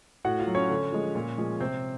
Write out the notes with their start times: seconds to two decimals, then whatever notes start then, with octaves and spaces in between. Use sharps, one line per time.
0.25 A2 F#4 F#5
0.39 F4 F5
0.47 F#3
0.55 C#4 C#5
0.70 D3
0.92 F3 G#3
1.15 A#2
1.38 F3 G#3
1.60 C3 C4 C5